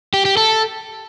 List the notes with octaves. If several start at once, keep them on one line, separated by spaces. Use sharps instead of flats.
G4
G4
A4